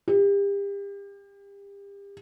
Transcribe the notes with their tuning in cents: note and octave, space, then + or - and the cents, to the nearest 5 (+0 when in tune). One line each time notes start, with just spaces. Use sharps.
G4 +35